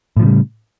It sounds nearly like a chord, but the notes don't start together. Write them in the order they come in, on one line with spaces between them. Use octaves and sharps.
A2 F3 C#3 G3